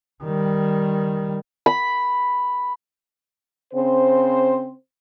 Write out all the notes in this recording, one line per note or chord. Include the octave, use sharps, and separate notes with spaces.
D#3 G3
B5
C#3 C4 C5